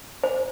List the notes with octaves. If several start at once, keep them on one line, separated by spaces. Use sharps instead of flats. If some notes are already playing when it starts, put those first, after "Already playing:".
C5